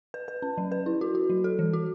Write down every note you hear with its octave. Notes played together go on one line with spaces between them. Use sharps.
B4
B4
C#4
F#3
B4
E4
F#4
F#4
F#3
A4
E3
F#4